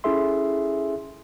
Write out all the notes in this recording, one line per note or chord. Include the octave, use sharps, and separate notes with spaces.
C#4 E4 G#4 A4 E5 C6